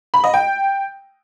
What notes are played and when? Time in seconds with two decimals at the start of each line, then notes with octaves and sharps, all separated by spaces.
0.14 B5
0.24 D#5
0.34 G5